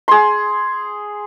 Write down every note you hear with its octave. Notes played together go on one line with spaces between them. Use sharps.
G#4 C6